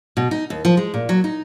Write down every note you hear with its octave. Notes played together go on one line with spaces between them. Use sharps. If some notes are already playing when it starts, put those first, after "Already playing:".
B2
D#4
D#2
F3
G#3
A#2
F#3
D#4